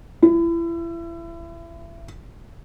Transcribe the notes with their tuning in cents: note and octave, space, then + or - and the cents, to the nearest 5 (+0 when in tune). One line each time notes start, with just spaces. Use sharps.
E4 +30